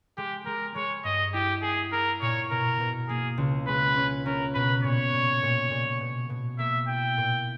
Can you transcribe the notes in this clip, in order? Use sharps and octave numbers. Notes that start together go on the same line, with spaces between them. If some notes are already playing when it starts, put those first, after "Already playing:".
G#3 G4
G#3 A#4
G#3 C#5
G2 D#5
E4 G4
A#3 G#4
E4 A#4
A#2 C#5
B2 A#4
B2
A#3 G#4
C#2
G#3 B4
C#4
C#4 A#4
B2 B4
A#2 C#5
A#2
A#2
A#2
B2
B2
A#3 E5
E4 G5
A#2